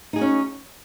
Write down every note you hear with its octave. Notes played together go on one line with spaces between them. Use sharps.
C#4 D#4 F#4 G#4